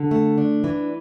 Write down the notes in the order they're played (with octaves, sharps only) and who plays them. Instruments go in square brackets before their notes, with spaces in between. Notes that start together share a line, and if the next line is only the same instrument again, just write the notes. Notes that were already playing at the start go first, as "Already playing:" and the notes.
Already playing: [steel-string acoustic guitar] D3
A3
D4
E3